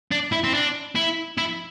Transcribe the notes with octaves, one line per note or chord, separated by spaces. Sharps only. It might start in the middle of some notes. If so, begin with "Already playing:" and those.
D4
E4
C4
D4
E4
E4